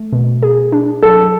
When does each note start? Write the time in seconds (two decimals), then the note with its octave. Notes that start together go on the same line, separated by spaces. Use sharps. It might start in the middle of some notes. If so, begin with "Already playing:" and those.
Already playing: A3
0.13 B2
0.43 G#4
0.72 D4
1.02 F#3 A4